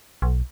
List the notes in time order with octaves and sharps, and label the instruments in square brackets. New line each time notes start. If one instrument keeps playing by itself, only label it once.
[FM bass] B1